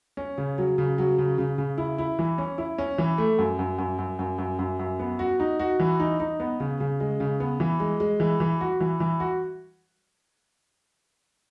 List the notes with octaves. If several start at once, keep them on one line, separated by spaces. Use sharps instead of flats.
C#4
C#3
F#3
C#3
F#3
C#3
C#3
C#3
E4
E4
E3
C#4
E4
C#4
E3
A3
F#2
F#2
F#2
F#2
F#2
F#2
F#2
F#2
B3
F#4
D#4
F#4
E3
D#4
D#4
B3
C#3
C#3
G#3
C#3
B3
E3
G#3
G#3
E3
E3
F#4
E3
E3
F#4